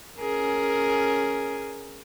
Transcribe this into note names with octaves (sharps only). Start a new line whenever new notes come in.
C#4 G#4 A#4